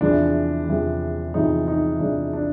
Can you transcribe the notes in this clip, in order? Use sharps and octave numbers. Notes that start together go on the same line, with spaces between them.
E2 C3 F3 G#3 D4
E2 C3 F3 G#3
E2 C3 F3 G#3 D#4
D#4
E2 C3 F3 G#3 D4
D4